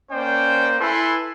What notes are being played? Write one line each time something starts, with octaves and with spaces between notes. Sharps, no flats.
A#3 C#4 C5 D5 G5
E4 A4 B4 G#5 C6